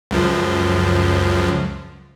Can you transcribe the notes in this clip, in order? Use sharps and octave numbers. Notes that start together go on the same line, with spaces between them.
C#2 F#2 F3